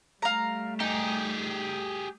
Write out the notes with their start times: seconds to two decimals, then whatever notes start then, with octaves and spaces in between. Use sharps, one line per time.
0.22 G3 A3 F5 A#5
0.80 D#4 G4 G#4